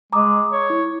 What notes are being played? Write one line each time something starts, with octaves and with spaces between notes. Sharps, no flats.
G#3 A#5 D6 D#6
C#5
E4